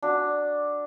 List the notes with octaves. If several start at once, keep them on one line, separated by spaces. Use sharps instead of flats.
D4 F#4